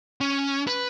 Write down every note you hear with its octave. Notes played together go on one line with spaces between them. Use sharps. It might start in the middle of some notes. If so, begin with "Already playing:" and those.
C#4
B4